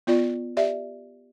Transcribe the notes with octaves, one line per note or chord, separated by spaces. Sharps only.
B3 F4 D5
G4 D5 E5